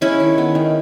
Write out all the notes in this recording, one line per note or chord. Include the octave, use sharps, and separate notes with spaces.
G#3 C#4 E4
D#3
B3
D#3